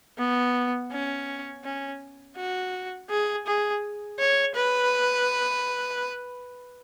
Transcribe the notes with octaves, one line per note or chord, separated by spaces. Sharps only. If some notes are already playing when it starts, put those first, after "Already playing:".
B3
C#4
C#4
F#4
G#4
G#4
C#5
B4